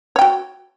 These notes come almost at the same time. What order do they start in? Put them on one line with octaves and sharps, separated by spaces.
C#5 G5 F#4